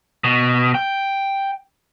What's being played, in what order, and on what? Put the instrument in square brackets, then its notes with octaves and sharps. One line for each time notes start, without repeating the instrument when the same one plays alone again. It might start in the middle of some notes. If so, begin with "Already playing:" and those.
[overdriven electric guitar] B2
G5